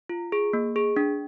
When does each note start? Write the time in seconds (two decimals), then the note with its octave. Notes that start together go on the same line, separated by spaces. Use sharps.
0.09 F4
0.32 G#4
0.53 A#3
0.76 G#4
0.97 D4